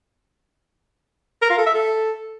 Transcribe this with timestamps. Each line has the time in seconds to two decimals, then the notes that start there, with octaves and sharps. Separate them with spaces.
1.42 A#4
1.50 F4
1.58 A4
1.66 E5
1.74 A4